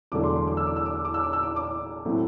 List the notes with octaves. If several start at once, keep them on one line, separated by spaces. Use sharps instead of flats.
E1 E2 D3 F#3 A3 D6
C6
C6
D6
E6
D6
E6
D6
E6
D6
E6
D6
E6
D6
D6
A2 F#3 A3 C4